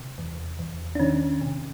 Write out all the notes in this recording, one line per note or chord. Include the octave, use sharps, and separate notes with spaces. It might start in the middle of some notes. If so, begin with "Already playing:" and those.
Already playing: C3
E2
E2
D4
D#3 C#4
C3